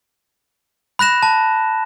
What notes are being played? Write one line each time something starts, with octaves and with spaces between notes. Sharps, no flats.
B5 F#6 A#6 E7
A5